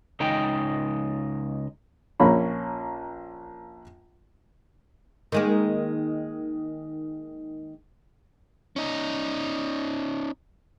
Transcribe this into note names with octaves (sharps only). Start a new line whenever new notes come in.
C#2 G#3 D#4 G5
A#1 A#3 C#4 B5
D#3 G#3 A#3
C#4 D#4